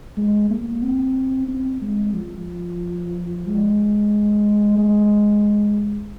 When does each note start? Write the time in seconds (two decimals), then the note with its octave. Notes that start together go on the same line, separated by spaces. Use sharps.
0.18 G#3
0.51 A#3
0.83 C4
1.48 C4
1.82 G#3
2.15 F3
3.47 G#3
4.78 G#3